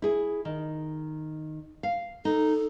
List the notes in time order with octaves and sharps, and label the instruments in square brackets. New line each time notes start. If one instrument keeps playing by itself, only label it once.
[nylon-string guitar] E4 G#4
D#3
F5
[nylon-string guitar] D#4 [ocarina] A4